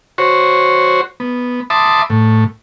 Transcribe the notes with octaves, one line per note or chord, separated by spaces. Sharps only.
F#4 C5 C#5
B3
E5 A5 B5 C6 D6 D#6
A2